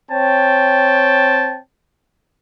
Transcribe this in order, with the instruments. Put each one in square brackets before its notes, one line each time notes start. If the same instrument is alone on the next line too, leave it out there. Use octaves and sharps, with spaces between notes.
[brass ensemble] C4 C#5 G5 A5